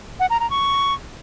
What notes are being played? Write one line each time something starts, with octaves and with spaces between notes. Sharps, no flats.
F#5
A#5
A#5
C#6